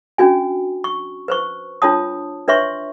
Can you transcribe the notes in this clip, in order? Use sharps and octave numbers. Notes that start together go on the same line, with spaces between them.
C#4 D4 F#4 G#5
C#6
B4 C5 C#6
D4 F4 C#5 A5 D#6
D4 B4 C#5 E5 C6 C#6